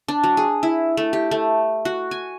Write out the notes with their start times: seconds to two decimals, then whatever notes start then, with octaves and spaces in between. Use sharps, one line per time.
0.08 D4
0.24 F#3
0.37 G#4
0.63 E4
0.97 A3
1.13 G4
1.31 A3
1.85 F#4
2.11 G#5